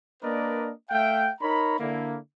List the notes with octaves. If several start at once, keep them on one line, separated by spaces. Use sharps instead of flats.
A#3 D4 A#4 B4 D5 D#5
A3 E5 F5 G5
D#4 A#4 C#5 A#5 B5
D3 A#3 E4